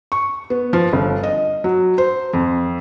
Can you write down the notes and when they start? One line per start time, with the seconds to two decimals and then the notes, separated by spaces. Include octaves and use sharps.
0.12 C#6
0.50 B3
0.73 F3
0.93 G1
1.23 D#5
1.64 F#3
1.98 C5
2.34 F2